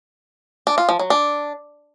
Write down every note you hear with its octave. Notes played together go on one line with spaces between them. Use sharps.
D4
F4
F3
F#3
D4